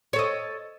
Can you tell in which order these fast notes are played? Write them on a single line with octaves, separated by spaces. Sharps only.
C#5 A4 D#5